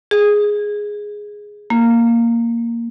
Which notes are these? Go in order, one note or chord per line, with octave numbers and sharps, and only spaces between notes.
G#4
A#3